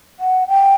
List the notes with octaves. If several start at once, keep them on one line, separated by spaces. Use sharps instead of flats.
F#5
G5